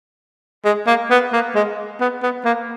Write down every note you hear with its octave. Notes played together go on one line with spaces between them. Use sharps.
G#3
A#3
B3
A#3
G#3
B3
B3
A#3